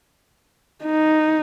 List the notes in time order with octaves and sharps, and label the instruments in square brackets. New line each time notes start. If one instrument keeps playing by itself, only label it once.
[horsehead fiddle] D#4